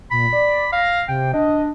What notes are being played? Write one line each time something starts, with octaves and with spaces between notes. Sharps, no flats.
A#2 B5
D5
F5 A#6
C3 G5
D4 D#5